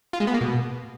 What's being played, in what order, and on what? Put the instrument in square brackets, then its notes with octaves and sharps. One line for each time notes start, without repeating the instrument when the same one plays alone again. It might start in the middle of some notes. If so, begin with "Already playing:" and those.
[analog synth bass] F4
G#3
B3
A#3
B2